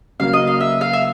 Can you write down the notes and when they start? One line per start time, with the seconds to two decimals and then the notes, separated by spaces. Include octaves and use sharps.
0.20 C#3 F#3 A#3 F5
0.33 D#5
0.47 F5
0.61 E5
0.81 F5
0.93 E5